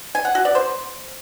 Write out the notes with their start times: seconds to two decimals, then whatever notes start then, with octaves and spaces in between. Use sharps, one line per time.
0.15 G#5
0.25 F#5
0.35 F#4
0.45 D5
0.55 C5